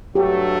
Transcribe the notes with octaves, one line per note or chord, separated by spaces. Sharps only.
G2 F#3 A3 G4